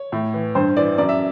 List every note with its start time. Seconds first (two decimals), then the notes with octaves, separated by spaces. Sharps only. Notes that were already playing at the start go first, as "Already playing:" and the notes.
Already playing: C#5
0.12 A2
0.34 E3
0.55 G2 C5
0.76 E3 D5
0.98 F#2 D5
1.09 E5